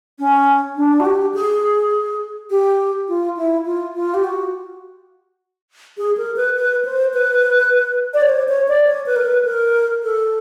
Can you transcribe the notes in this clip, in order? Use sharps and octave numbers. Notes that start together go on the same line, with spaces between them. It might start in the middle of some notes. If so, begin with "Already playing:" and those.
C#4
D4
F#4
G4
G#4
G4
F4
E4
F4
F4
G4
F#4
G#4
A#4
B4
B4
C5
B4
D5
C#5
C5
C#5
D5
C#5
B4
A#4
B4
A#4
A4